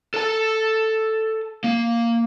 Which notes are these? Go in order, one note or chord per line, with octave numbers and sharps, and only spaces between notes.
A4 A5
A#3